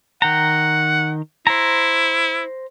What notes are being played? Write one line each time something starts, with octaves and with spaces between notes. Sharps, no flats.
D#3 F#5 G5 A#5
E4 C5 A#5